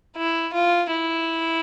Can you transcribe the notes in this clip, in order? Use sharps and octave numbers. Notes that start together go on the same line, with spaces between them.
E4
F4
E4